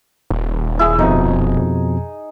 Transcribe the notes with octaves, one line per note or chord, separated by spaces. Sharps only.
D#1
E4 G#4
F2 B2 F3 D#4